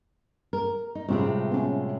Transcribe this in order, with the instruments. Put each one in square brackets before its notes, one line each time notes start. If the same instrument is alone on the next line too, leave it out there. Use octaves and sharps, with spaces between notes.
[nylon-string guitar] A#4
D#4
[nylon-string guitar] A2 C3 G#3 [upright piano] F3 G3
[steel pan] B3 C#4